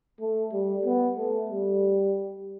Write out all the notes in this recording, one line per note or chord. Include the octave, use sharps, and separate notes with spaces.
A3
G3
B3
A3
G3